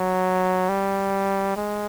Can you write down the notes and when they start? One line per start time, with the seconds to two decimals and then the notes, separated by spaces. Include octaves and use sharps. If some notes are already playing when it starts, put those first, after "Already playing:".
Already playing: F#3
0.69 G3
1.56 G#3